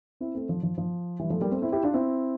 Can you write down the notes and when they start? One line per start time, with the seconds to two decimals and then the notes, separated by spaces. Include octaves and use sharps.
0.20 C4 E4
0.34 A3 C4
0.49 F3
0.63 F3
0.78 F3
1.19 E3 G3
1.30 F3 A3
1.41 G3 A#3
1.51 A3 C4
1.62 C4 E4
1.72 E4 G4
1.83 D4 F4
1.93 C4 E4